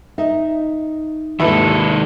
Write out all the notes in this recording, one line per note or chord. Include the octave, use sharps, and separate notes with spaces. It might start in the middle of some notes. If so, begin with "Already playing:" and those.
D#4 D#5 E5
D#2 G#2 D#3 E4 A4 B4